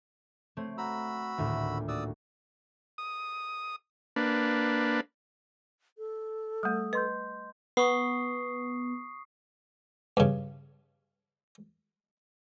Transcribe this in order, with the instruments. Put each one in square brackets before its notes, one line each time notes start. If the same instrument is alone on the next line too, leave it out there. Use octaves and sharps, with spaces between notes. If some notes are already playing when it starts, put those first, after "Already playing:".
[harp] A3 C4 C#5
[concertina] F#4 B5 E6 [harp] A#5
[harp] D#1 D2 A2
[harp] F#4 [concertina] D5 D#6 E6
[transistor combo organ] D#6
A#3 D4 B4
[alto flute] A4
[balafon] G3 A3 [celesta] D#6
[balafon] B4 [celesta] D#5 C6 G6
[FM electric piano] B3 [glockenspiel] C#6 D#6 C7
[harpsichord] G2 C#3